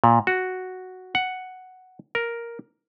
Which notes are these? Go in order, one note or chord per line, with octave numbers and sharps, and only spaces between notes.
A#2
F#4
F#5
A#4